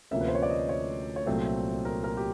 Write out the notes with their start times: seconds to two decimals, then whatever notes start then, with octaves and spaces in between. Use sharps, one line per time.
0.11 D2 C3 F3 A#3 C#4 E5
0.21 B4
0.28 C5
0.35 C#5
0.43 D5
0.50 D#5
0.69 C#5
1.16 C#5
1.26 C2 A#2 F#3 A3 C4 C5
1.85 A#4
2.04 A#4
2.17 G4